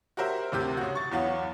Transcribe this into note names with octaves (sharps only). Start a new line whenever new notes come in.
F#4 G4 A#4 C5 E5
D2 C3 G4 G6
C#3 F#4
C#6 A6
E2 F#3 B3 F5